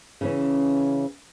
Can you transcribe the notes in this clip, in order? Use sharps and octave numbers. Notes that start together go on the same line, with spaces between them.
C#3 E3 C#4